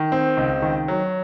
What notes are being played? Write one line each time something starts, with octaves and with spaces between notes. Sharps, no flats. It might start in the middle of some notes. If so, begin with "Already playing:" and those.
Already playing: D#3
C4
C#2
D#3
F#3